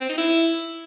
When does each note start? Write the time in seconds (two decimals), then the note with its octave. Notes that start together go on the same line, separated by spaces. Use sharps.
0.01 C4
0.09 D#4
0.17 E4